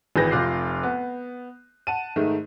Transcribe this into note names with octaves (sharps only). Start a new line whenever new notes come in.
G#1 E3 G#4 B4 G6 A#6
F1 F4 D6 F#6 C7
B3
F#5 A5 D#7
G#2 D#3 A3